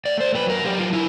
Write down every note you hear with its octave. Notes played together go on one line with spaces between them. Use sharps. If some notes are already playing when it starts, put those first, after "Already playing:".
A3 D5
C5
F#3 B4
A#4
F#3 G4
F4
E4